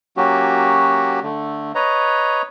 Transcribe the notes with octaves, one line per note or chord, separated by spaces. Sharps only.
F#3 A#3 C#4 F#4 G4
D3 A3
B4 C#5 D#5 A#5